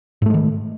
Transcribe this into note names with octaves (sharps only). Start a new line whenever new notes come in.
G#2 D#3 G#3 A3